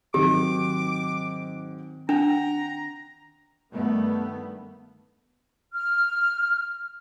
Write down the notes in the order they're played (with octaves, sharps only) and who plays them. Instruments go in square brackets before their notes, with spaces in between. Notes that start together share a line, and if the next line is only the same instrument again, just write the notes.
[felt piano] G#2 F#3 [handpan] D#3 C4 [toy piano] G4 [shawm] D6
[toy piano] D4 [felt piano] F#5 G5 [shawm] A#5
[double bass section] G2 D#3 A3 B3
[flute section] F6